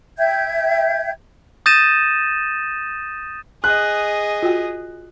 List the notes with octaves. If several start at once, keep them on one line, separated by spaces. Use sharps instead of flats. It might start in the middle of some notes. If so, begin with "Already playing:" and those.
E5 G5 G6 G#6
D#6 G6 A6 A#6 D#7 E7
G#4 D#5 F#6
F4 F#4 G5